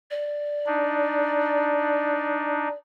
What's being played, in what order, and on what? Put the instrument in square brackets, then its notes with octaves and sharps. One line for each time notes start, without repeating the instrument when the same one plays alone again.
[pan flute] D5
[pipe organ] D4 D#4